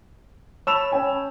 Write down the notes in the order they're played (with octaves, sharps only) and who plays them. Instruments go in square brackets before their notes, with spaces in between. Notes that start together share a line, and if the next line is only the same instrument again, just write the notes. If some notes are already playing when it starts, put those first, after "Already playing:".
[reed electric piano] C#5 A5 B5 [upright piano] E6 E7 F7
[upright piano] C#4 G5 G#5